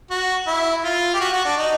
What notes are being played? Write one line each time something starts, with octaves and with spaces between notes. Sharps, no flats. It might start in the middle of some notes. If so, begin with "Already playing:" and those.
F#4
E4
F4
G4
F#4
F#4
D4
D#4